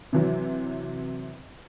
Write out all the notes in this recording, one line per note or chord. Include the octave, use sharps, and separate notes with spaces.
C3 E3 F#3